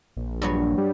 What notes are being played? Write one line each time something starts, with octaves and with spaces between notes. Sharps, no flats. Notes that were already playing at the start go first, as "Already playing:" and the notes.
A#1
G2 F#3 C#5
G3